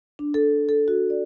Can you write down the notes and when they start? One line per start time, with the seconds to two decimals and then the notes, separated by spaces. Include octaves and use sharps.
0.19 D4
0.34 A4
0.69 A4
0.88 F#4
1.10 D5